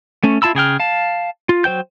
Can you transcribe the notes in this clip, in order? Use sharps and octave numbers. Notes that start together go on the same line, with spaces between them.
A3 C#4
E4 F4 A5 B5 E6
C#3 G#4 G5 F6
F5 A5
F4
F#3 C5 G5 G6